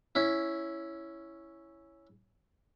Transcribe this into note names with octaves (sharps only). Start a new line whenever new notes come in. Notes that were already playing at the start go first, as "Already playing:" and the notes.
C#4 E4